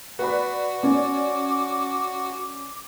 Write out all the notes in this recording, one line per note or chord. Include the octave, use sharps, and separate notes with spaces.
F#4 B4 D5 B5
C#4 D5 D6